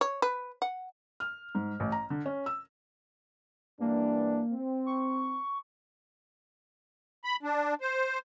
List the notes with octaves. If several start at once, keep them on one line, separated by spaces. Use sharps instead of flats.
C#5
B4
F#5
F6
G#2
A1
A#5
D3
C#4
E6
G2 E3 A#3 D4
C4
C#6
B5
D4
C5